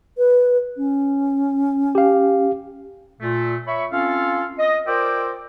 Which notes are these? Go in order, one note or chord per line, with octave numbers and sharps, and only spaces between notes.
B4
C#4
G4 F5
A#2 A3
C#5 E5 B5 C#6
C4 C#4 F4 A4 F5
D#5
F4 A#4 C5 D5 G5 E6